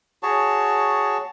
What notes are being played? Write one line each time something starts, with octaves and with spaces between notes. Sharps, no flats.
F#4 G#4 C#5 A5